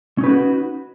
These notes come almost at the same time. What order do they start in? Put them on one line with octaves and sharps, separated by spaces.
C#4 D#4 B4 G4 F#4